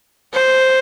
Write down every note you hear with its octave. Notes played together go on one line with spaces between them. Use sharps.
C5